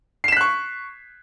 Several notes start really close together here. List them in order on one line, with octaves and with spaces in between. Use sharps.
C7 E7 B6 F#6 C#6